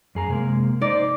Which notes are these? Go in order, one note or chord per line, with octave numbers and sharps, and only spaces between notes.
F#2 G#4 A#5
C3 G#3 A#3
D#4 C5 D5